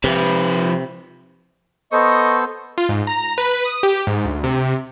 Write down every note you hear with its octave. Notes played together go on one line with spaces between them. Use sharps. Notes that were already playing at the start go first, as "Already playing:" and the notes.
C3 F3 B4
B3 A4 C5 D#5 C#6
F4
G#2
A#5
B4
D#6
G4
G#2
D2
C3